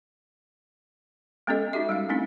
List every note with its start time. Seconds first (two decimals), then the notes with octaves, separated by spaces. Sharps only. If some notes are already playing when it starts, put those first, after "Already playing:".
1.47 G#3 B3 C#4 G4 A4 D#5
1.73 D#4 F#4 G4 E5
1.89 G3 G#3 F5
2.09 A3 C4 C#4 D#4 E4